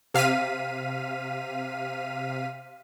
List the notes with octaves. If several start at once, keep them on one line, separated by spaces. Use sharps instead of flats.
C3 F5 F6 B6 D#7